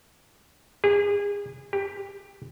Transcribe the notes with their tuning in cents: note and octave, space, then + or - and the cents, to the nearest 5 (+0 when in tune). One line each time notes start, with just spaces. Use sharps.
G#4 -35
G4 +15